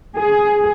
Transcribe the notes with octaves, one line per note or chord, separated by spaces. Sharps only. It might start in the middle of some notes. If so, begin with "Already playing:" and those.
G#4